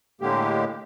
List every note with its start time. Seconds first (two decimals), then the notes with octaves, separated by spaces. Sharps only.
0.21 A2 D3 G#3 A#3 G4